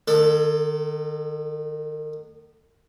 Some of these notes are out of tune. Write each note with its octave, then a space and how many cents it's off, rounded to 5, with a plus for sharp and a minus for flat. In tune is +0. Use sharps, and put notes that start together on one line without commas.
D#3 -35 A4 +10